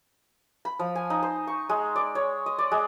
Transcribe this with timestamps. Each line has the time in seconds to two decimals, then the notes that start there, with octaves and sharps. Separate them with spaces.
0.65 B5
0.79 F3
0.95 G#5
1.10 D#4
1.22 C5
1.47 C#6
1.69 G#3
1.96 D5
2.15 C#5
2.46 D#5
2.58 D5
2.72 G#3